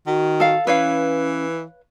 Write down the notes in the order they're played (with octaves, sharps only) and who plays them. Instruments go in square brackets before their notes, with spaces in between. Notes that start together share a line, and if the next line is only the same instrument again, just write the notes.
[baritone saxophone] D#3 [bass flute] F#4
[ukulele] A4 F5
[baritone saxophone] E3 [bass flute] C#4 [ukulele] B4 C#5 F5